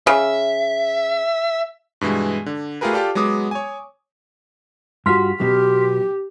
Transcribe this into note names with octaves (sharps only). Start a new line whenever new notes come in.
C#3 E5
G2 B2 E3 G#3
D3
A3 F4 G4 G#4 A#4 B4
F4 G4 A4 D5
F#3 G#3 B3 D6 D#6
C#5 G#5
G2 F4 F#4 C6 F6 B6
B2 F#3 G4